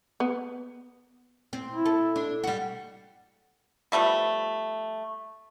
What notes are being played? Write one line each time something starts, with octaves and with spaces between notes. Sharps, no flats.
B3
C4
E4
A4
D4
G3 F#4
F3 G3 A3 B3